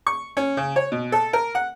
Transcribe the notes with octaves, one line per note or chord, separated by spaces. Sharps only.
C#6
C#4
C#3
C#5
B2
A4
A#4
F#5